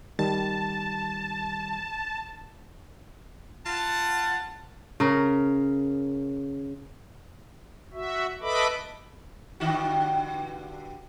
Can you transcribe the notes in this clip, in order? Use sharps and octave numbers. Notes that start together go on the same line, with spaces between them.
D#3 G3 A5
F4 F#5 A5
C#3 A#4
F#4 E5
A4 B4 D#5 E5 B5 D6
G2 D3 F#4